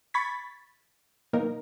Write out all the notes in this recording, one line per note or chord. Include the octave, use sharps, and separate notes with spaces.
B5 C#6 G#6 A6 B6
B1 D#3 A#3 D#4 A#4